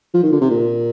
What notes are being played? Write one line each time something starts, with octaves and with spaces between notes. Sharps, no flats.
F3
D#3
D3
C3
A#2